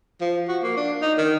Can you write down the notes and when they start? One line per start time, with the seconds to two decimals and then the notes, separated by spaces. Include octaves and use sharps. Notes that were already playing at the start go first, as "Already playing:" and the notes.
0.21 F3
0.48 F#4
0.63 A#3
0.77 D4
1.02 D#4
1.18 D#3